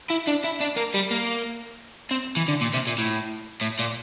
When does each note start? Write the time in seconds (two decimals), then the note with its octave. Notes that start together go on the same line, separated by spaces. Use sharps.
0.10 E4
0.27 D4
0.44 E4
0.60 D4
0.76 A#3
0.94 G3
1.11 A#3
2.11 C4
2.36 E3
2.48 D3
2.61 A#2
2.74 C3
2.87 A#2
2.98 A2
3.61 A2
3.79 A#2